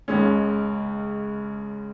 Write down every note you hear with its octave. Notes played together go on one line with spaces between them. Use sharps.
C#2 C#3 G#3 C#4